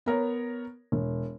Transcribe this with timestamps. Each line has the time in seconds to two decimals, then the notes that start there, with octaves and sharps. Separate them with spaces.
0.06 B3 A#4 C#5
0.92 E1